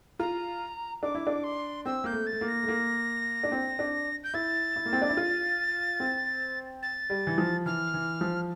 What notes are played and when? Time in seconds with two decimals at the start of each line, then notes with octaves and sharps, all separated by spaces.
0.19 F4 A#5
1.03 D4 D6
1.15 E4
1.27 D4
1.43 C6
1.85 C4 E6
2.04 A#3 G6
2.12 A3
2.26 A6
2.32 A3
2.41 A#3
2.48 A#6
2.63 A3
2.68 A#3
3.43 D4
3.52 C4
3.79 D4
4.23 G6
4.34 E4 A6
4.76 E4
4.86 A#3
4.93 C4
5.02 D4
5.09 E4
5.17 F4
6.00 C4
6.82 A6
7.10 G3
7.27 E3
7.38 F3
7.66 E3 F6
7.94 E3
8.21 F3